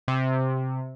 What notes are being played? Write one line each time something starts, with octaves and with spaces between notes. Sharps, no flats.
C3